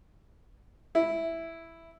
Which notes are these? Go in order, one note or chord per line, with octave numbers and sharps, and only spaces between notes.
E4